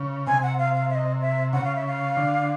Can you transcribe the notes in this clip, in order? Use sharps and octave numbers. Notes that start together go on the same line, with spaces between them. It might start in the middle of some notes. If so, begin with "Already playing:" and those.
Already playing: C#3
C3 G#5
F#5
F5
F5
E5
D#5
E5
C#3 F#5
F5
E5
F5
D3